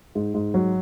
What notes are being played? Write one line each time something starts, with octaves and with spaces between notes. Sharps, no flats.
G#2
G#2
F#3